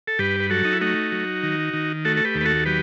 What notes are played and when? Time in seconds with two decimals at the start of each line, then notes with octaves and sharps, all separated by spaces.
0.08 A4
0.19 G2 G4 B4
0.40 B4
0.50 F#3 F#4 A4
0.65 D#4
0.73 E4
0.81 A3 D#4 F#4
1.12 F#3
1.43 D#3
1.73 D#3
2.05 A3 F#4 A4
2.17 A4
2.25 G4 B4
2.35 D#2
2.41 B4
2.45 F#4 A4
2.66 F#3 G4 B4